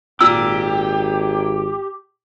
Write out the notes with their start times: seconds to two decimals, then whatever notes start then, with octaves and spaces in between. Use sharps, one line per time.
0.21 G#1 A#2 G4 E6